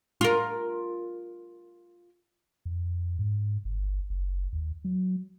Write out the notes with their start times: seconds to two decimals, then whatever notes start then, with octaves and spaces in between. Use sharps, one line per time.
0.21 F4 A#4
2.65 F2
3.19 G#2
3.65 G1
4.10 F#1
4.53 D#2
4.84 F#3